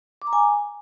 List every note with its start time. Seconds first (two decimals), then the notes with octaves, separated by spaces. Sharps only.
0.22 D6
0.27 A#5
0.33 G#5